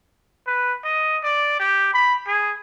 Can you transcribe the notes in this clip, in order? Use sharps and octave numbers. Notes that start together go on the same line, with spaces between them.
B4
D#5
D5
G4
B5
G#4